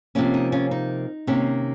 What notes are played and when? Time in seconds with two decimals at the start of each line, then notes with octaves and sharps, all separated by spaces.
0.15 C3 F3 A#3 C#4
0.34 D#4
0.52 C#4 F4
0.71 D#4
1.27 C3 D#3 A#3 C#4